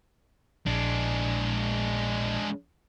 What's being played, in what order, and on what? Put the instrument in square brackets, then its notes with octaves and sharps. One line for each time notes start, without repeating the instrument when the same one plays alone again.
[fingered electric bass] A#1 [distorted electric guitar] G#3 D4